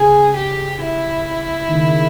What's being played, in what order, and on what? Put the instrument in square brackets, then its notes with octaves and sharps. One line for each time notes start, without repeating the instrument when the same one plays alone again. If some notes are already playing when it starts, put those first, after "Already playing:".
Already playing: [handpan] C#3 [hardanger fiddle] G#4
[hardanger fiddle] G4
E4
[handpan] D#3
C#3